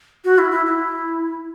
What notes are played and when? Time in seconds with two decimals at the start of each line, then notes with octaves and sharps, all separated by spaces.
0.25 F#4
0.38 E4
0.51 E4
0.66 E4